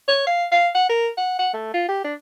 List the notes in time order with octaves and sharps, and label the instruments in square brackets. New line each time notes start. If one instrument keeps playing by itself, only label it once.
[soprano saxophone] C#5
F5
F5
F#5
A#4
F#5
F#5
A3
F4
G4
D4